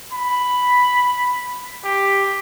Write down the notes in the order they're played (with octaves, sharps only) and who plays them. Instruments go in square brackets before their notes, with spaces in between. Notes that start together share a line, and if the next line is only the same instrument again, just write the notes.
[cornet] B5
G4